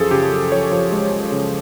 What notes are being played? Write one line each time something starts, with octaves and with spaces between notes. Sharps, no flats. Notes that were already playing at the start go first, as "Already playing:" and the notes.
Already playing: F#2 F3 G#4 A4
C#3 G4
F#2
F3 C#5
F3
G#3
G#3
C#3